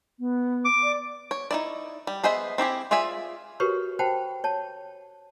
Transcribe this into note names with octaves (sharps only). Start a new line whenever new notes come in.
B3
D6
D5
C#5
D#4 E4 D5
G3
B3 G#4 C5 D#5 E5
C4 E4 G4 G#4
F4 G#4 D5 E5 G#5
F#4 G4 A#4 B4 C#5 C6
C5 F#5 G5 A5 B5
C#5 A5